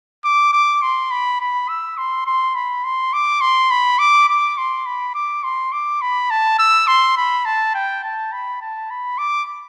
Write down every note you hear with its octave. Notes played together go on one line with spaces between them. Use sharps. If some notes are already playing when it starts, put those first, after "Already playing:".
D6
D6
C6
B5
B5
E6
C6
C6
B5
C6
D6
C6
B5
D6
D6
C6
B5
D6
C6
D6
B5
A5
E6
C6
B5
A5
G5
A5
B5
A5
B5
D6